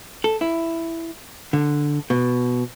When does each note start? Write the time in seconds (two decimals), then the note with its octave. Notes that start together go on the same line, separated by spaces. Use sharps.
0.24 A4
0.41 E4
1.53 D3
2.10 B2